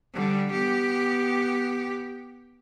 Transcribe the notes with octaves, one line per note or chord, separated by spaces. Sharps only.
D3 G3
B3 G4